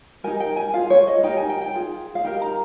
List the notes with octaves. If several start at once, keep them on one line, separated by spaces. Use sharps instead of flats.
D#4 G4 A#4 G#5
G5
G#5
F4 G#4 F5
C#5
D#5
D#4 G4 A#4 G5
G#5
G5
G5
F4 G#4
F5
D#4 G4 A#4 G5
A#5